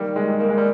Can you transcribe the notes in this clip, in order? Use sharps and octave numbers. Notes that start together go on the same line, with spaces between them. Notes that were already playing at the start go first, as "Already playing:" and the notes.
Already playing: D#3 G3 A#3
G#3
G#2
A#3
G#3
G3